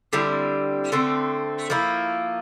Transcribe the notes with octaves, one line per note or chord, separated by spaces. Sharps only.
D3 G3 C4 E4
D3 A3 C4
F3 A#3 E4